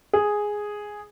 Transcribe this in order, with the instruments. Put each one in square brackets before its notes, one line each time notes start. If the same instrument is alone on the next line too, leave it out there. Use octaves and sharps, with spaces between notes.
[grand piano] G#4